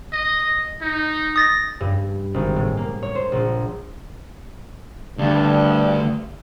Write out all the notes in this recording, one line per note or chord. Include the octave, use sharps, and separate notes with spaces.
D#5
D#4
D#6 A6 A#6
G2
G#1
A2
A#3
C#5
C5
A#1
D2 G2